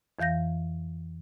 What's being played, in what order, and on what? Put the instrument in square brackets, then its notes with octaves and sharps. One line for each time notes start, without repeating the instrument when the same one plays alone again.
[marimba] F2 E3 F5 G6 A#6